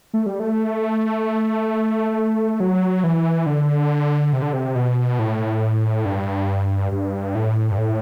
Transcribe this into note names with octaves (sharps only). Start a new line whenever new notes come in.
A3
G3
A3
F#3
E3
D3
C3
D3
C3
B2
A2
G2
G2
A2
G2
A2